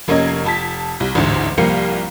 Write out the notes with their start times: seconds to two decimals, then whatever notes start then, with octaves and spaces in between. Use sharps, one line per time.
0.08 F1 A#3 C#4 D#5 G#6
0.44 F1 A5 B6
1.00 C2
1.15 A1 D2 G#2
1.57 C2 F3 G3 A#3 F5 C#7